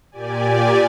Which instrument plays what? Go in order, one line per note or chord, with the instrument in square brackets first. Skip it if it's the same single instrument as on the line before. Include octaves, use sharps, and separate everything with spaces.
[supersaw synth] A#2 G4 D5 G#5